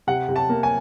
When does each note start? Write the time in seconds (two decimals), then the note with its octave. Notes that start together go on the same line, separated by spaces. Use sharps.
0.07 C3 F#5
0.29 C3
0.36 A5
0.49 A#3
0.63 G#5